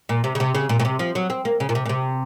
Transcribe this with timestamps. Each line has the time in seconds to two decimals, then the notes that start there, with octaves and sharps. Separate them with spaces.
0.09 A#2
0.24 C3
0.35 C#3
0.40 C3
0.55 C#3
0.69 A#2
0.80 A#2
0.85 C3
0.99 F3
1.15 F#3
1.30 C4
1.45 A#3
1.60 C#3
1.69 A#2
1.75 C3
1.86 A#2
1.89 C3